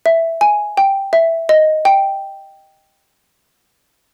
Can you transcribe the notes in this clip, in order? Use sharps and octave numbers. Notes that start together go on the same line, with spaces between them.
E5
G#5
G5
E5
D#5
G5